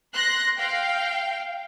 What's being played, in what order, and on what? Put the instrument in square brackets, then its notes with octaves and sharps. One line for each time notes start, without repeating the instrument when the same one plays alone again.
[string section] C6 F#6 A#6
F5 G5